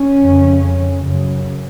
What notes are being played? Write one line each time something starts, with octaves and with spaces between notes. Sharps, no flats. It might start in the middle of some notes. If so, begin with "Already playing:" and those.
Already playing: C#4
F2 C#3
F#2 C#3